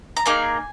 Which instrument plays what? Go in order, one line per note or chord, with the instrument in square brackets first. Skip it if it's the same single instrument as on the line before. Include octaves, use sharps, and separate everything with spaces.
[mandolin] A#5
A#3 D#4 G#4 G#5